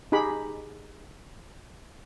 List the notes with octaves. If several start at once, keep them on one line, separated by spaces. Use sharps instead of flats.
D#4 G4 G#4 B5